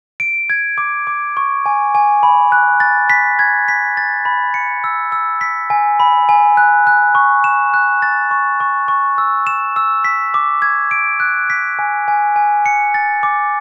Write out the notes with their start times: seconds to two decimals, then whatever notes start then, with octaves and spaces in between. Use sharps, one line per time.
0.20 D7
0.50 G#6
0.78 D6
1.07 D6
1.37 C#6
1.66 G#5
1.95 G#5
2.23 B5
2.52 F#6
2.80 A6
3.10 B6
3.39 G#6
3.68 B6
3.97 A6
4.25 B5
4.54 C#7
4.84 E6
5.12 E6
5.41 B6
5.70 G#5
6.00 B5
6.29 G#5
6.57 F#6
6.87 F#6
7.15 C#6
7.44 E7
7.74 F#6
8.02 A6
8.31 C#6
8.60 C#6
8.88 C#6
9.18 E6
9.47 E7
9.76 E6
10.04 B6
10.34 D6
10.62 G#6
10.91 D7
11.20 F#6
11.50 B6
11.79 G#5
12.08 G#5
12.36 G#5
12.66 C#7
12.94 A6
13.23 D6